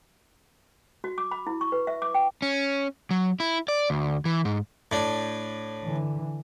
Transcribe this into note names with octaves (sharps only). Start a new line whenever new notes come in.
F#4
D6
B5
E4
C#6
B4
E5
D6
G5
C#4
F#3
E4
D5
D2
E3
G#2
A2 D4
D3 E3